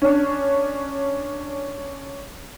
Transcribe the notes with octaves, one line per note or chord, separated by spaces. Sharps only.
C#4 D4